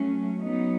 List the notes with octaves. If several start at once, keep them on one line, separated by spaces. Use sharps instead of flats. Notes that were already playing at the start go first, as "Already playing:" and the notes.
Already playing: F#3 A3 C#4
F#3 B3 D#4